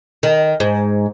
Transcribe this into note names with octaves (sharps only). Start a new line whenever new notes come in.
D#3
G#2